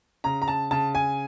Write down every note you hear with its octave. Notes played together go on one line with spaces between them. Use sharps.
C#3 A#5
A#5
A5
C#3 A5
G#5